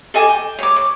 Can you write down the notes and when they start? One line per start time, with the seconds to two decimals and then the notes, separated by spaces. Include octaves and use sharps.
0.14 A4 D#5 G#5 D6
0.29 G5
0.59 C#5 D6
0.76 D6